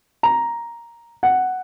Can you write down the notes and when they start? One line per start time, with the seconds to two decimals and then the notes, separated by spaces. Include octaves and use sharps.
0.23 A#5
1.23 F#5